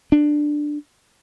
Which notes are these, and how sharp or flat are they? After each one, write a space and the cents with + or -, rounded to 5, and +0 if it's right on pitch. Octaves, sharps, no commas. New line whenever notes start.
D4 +10